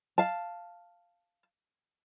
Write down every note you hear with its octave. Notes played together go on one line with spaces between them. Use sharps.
F5 A5